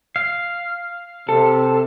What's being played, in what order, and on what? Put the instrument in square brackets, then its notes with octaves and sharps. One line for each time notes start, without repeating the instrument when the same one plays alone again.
[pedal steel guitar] F5
[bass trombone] C3 [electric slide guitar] A4